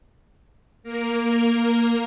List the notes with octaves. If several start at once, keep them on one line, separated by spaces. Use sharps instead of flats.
A#3 A#4